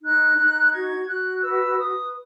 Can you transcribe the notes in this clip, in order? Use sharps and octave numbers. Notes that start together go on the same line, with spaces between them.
D#4 F#6
D#4
F#4 G#6
F#4 F#6
B4 E6
B4 D#6